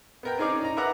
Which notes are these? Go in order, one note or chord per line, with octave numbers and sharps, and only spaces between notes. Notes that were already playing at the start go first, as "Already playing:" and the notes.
B3 A#4 G5
C4 C#4 D#4 G#4 A#4 D5
D#4 A#5
A#4 B4 D5 E5 F#5 A#5